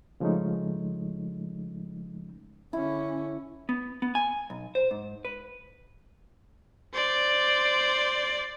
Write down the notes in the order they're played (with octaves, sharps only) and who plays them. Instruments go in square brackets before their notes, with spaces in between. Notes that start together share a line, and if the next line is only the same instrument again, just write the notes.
[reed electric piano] C#3 F3 G#3 A3 C#4 D#4
[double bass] D3 C#4 [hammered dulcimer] E4
[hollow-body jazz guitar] B3
B3
G#5
B1
C5
G#2
B4
[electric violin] C5 D5